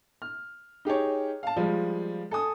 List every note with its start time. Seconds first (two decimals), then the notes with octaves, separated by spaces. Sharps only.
0.22 F6
0.85 D#4 G4 G#4 C#5
1.43 F5 A5
1.56 F3 G3 G#3 F4
2.31 A4 G#5 D#6